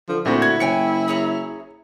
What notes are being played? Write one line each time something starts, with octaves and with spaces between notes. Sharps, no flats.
D3 F3
D2 A#2 C4 E4 F#4
F#4 G#6
F#1 C#5 G5 G#5 C#7
G#4 C#5 A#5